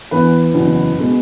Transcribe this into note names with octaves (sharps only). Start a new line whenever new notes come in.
E2 E3 B3 B4
F#1 E2 B2
B2 G#3 B3